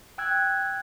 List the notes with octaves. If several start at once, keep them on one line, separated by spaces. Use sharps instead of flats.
G5 E6 F#6 G#6